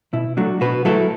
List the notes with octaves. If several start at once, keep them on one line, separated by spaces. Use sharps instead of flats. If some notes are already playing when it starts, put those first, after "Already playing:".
B2 E4
F#3 A3 D4 F#4
B2 F#4 B4
F#3 A3 E4 A4